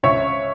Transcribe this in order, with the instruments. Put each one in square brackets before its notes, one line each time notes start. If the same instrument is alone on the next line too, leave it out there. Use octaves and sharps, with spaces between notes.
[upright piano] C#2 C#5 E5